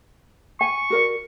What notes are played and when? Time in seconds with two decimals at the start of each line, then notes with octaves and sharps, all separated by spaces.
0.61 G#5 C#6
0.90 F#4 A#4 D5